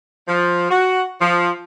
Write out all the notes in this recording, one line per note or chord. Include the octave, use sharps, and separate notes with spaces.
F3
F#4
F3